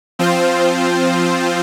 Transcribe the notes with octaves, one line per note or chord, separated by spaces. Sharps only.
F3 C4 F4 C5